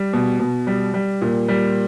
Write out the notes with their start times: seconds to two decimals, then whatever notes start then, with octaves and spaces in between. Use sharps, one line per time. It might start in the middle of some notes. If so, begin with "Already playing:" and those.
Already playing: G3
0.13 B2
0.40 B2
0.67 G3
0.94 G3
1.21 A#2
1.48 G3